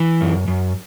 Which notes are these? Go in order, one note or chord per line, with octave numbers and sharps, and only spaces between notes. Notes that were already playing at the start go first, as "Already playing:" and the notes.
Already playing: E3
F#2
F#2